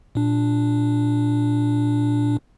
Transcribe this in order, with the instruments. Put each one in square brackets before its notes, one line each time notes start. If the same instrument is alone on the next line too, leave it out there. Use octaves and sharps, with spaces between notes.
[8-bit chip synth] A#2 D4